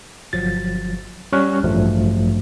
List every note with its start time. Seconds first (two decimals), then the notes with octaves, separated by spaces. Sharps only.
0.33 G1 F3 F#3 A6
1.33 G3 C#4 C#5 C#6 F6 F#6
1.63 A1 G2 F3 F#3 A3